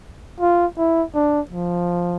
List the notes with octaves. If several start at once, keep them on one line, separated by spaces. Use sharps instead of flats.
F4
E4
D4
F3